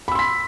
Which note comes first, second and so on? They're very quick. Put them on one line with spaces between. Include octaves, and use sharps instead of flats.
B5 E6 C6 B6